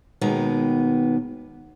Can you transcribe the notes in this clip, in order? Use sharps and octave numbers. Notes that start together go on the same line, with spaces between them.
D#2 B2 D#3 G#3 B3 A#5